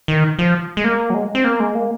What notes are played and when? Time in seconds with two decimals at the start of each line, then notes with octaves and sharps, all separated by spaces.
0.08 D#3
0.39 F3
0.77 G#3
0.84 A#3
1.10 F#3
1.14 G#3
1.35 C4
1.44 A#3
1.60 G#3
1.75 A#3